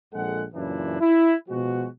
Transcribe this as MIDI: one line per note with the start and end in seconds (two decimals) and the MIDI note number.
0.14 0.44 34
0.14 0.44 41
0.14 0.44 56
0.14 0.44 69
0.14 0.44 78
0.54 0.97 42
0.54 0.97 46
0.54 0.97 49
0.54 0.97 52
0.54 0.97 62
0.54 0.97 64
1.01 1.35 64
1.49 1.88 47
1.49 1.88 53
1.49 1.88 56
1.49 1.88 66